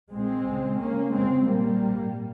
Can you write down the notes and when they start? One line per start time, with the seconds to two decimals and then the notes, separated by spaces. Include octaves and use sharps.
0.12 A#1 A#2 G#3 C4
0.45 C#2 C#3
0.79 C#2 C#3 A#3 C#4
1.13 F1 F2 C#3 G#3 C4
1.46 A#1 A#2 G3 A#3
1.80 A#1 G#2